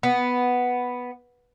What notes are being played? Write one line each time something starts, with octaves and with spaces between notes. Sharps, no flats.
B3